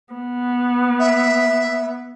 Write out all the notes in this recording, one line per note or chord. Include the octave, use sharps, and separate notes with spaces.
B3
E5